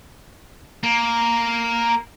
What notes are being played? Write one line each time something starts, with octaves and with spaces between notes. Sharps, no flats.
A#3